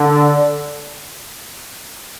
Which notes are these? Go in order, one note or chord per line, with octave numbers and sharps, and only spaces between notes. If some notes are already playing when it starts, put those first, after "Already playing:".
Already playing: D3